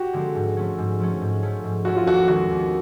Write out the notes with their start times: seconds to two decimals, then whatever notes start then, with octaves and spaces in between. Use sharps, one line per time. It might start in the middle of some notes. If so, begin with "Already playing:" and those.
Already playing: F#4 G4
0.13 D3 F3 G#3 C4
0.35 G#2
0.57 F3 A3 C#4
0.78 G#2
1.00 F3 A3 C#4
1.21 G#2
1.43 F3 A3 C#4
1.64 G#2
1.85 F3 A3 C#4 F#4
1.96 F4
2.06 D#2 F#4
2.28 D#3 G#3 C4 D#4 F#4
2.50 D#2